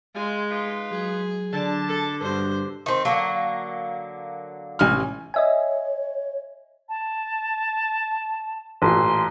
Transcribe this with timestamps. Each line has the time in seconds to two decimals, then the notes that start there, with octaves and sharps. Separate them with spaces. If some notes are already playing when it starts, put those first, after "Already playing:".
0.14 G#3 F4 G#5
0.49 D#4 F4 B4
0.92 F#3 G#4
1.53 D3 A5
1.88 A4
2.22 G2 B2 C5
2.86 D#3 C4
3.05 D3 F#3 A#3
4.79 A1 G#5 F6
5.34 C#5 D#5 E5 G#5
6.89 A5
8.82 A1 A#2 C6